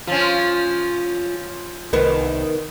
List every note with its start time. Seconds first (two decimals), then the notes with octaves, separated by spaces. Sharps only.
0.07 F3 C#4 F4
1.93 C2 D#3 B3